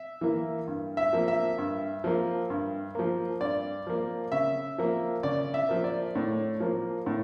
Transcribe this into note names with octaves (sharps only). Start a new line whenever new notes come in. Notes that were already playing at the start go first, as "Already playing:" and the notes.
Already playing: E5
E3 A#3
G2
E5
F3 A#3
E5
G2
F3 A#3
G2
F3 A#3
G2 D5
F3 A#3
C#3 E5
F3 A#3
C#3 D5
E5
F3 A#3
D5
A2
F3 A#3
A2